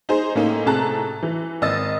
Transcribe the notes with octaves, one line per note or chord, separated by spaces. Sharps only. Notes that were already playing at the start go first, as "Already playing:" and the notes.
D#4 G#4 C5
A2 A#3 C#4 D#4
A2 C3 G#4 A5 A#5 F#6
E3
G#1 D#5 E6 A6